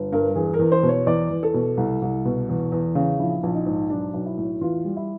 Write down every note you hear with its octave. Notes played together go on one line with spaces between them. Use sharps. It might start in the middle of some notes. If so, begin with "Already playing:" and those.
Already playing: G1
G2 A#4
E2 G#4
A#4
E2
C5
B2
C#5
E2 D5
E2
A4
B2
C2
C2
B2
E2
E2
C#3
A#1 E4
A#1
D#4
G#2
B1 D4
B1
E4
A2
E2 F4
G3
E4